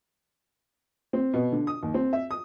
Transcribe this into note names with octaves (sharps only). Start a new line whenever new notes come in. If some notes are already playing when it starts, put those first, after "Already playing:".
C4
B2
D3
D#6
D#2
C4
E5
D#6